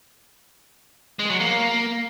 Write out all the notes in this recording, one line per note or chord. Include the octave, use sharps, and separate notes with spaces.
G#3
F#3
A#3